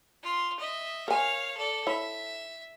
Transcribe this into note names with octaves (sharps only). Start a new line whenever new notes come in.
F4 C6
D#5 E5
A#4 C#5 F5 G#5
A4 D5
E4 C#5 E5